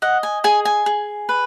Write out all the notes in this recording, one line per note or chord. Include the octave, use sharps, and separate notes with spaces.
D#5 F#5
G#5
G#4 G#5
G#5
G#4
B4